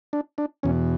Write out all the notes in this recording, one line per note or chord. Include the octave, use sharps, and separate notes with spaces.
D4
D4
E2 B2 C#4